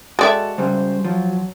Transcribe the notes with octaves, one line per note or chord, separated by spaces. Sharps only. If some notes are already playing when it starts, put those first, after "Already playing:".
G#3 F#4 A4 D5 E5 G5 A5
C#3 G3 C5
F3 F#3